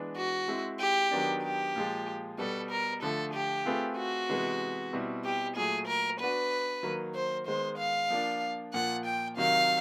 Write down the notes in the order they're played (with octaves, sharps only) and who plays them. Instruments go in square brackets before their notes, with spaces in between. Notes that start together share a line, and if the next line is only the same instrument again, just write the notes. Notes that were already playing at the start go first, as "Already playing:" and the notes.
Already playing: [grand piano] E3 G#3 B3 D4
[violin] F#4
[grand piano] G#3 C4 E4
[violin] G4
[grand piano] D#3 F#3 B3 D4
[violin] G4
[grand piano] A#2 F3 G#3
[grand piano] B2 G3 B3 [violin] A4
[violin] A#4
[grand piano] D3 F3 A3 [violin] A4
[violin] G4
[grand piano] A3 C4 F4 G#4 B4
[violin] F#4
[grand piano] C3 E3 G#3 B3
B2 G3 C4 E4
[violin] G4
[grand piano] A#2 F#3 A3 [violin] G#4
[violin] A#4
[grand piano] B3 D4 F#4 [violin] B4
[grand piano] D#3 F#3 A#3
[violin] C5
[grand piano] D#3 G#3 B3 [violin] C5
[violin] F5
[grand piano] F3 A#3 D4
[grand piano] A#2 F3 A#3 [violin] F#5
[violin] G5
[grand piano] C3 D#3 F#3 [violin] F5